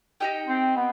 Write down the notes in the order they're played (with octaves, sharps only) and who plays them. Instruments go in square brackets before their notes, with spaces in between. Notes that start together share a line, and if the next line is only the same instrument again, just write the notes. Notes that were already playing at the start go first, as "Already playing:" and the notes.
[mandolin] D#4 G4 D#5 G5
[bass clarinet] C4
B3